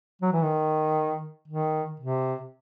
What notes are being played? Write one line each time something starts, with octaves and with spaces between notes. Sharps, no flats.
F#3
E3
D#3
D#3
C3